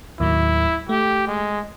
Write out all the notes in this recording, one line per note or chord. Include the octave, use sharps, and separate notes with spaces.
D#2 A2 F#3 E4
A3 G4
G#3